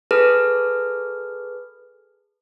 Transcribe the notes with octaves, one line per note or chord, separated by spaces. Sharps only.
G#4 A4 B4 F6